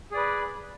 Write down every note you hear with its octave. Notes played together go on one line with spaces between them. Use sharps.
G#4 B4 D5